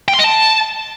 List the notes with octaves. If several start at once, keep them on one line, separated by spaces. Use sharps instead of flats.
G5
C6
D#5
A5